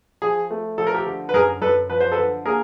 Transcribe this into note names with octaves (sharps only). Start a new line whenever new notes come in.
F3 G#4
A3
F3 A4
A#4
G4 A4
D3
B4
F#2 G#4 A#4
F#2 A4 B4
F3 B4
C5
A4 B4
D3
A#3 G#4 A#4